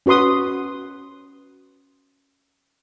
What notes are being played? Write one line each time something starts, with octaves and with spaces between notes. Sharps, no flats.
C#4 F#4 B4 C6 D#6